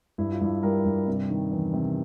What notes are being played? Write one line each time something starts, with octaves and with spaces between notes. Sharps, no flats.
G2 E4
F4
G2 E4
G3 A#4
G2
C3
D#3
E2
C3